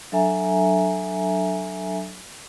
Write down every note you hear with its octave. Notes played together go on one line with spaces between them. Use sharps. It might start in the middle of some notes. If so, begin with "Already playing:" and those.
F#3 D4 A4 E5 G#5 A#5